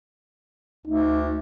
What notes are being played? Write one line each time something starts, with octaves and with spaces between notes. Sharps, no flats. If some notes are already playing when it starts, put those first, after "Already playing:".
D2 D#4